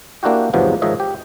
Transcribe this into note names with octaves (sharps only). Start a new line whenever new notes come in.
A#3 D4 E4 F#4 G4
E2 G#2 C3 F3 F#3 B3
G#2 D#3 F3 C#5 D#5 E5
G4